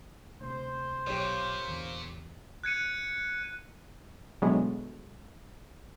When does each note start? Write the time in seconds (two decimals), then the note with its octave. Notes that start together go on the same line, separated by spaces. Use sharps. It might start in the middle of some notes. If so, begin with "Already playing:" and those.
0.41 D2 C3 C5
1.07 B1 A#2 G4 C#5
1.68 E2 D3
2.64 F#6 G#6 C#7 D#7
4.42 B2 D3 F#3 G#3 A3 B3